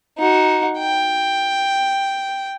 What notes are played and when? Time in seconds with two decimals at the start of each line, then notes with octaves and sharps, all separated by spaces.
0.18 D#4 F#4
0.79 G5